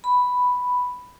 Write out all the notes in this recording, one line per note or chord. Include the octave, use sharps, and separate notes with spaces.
B5